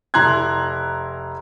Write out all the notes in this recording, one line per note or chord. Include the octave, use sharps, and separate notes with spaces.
F1 E4 A#5 C6 F#6 G#6